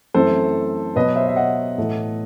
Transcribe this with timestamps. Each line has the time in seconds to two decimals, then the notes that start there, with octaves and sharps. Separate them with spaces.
0.14 F#2 E3 A3 C4 A4 C5
0.96 B2 F#3 B3 B4 D#5
1.16 C5 E5
1.27 E5
1.36 D#5 F#5
1.78 A2 E3 A3